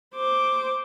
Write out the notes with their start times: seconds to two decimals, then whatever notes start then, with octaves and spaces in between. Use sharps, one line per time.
0.15 C5 D6